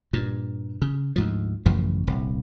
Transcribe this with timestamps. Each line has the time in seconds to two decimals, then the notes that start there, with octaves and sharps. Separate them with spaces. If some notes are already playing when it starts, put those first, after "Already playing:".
0.13 G2 A#2
0.82 C#3
1.16 D2 G#2 F3
1.66 A1 F#2 C#3 F3
2.07 D#1 C2